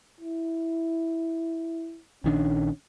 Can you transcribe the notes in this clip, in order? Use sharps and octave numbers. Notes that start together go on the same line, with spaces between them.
E4
A#1 D#3 C#4 D4